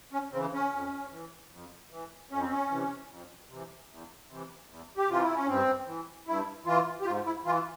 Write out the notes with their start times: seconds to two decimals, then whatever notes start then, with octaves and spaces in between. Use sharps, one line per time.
0.13 C#4
0.33 C#3 E3 C4
0.53 C#4
0.72 F2
1.11 E3
1.51 F2
1.90 E3
2.31 F2 C#4
2.41 C4
2.50 C#4
2.70 C3 E3
3.09 F2
3.49 C3 E3
3.89 E2
4.29 C3 E3
4.68 E2
4.97 G4
5.08 C3 E3 F4
5.22 E4
5.35 C#4
5.48 G2 C4
5.87 E3
6.27 G2 E4
6.66 E3 F4
7.01 G4
7.06 G#2 F4
7.26 E4
7.45 E3 F4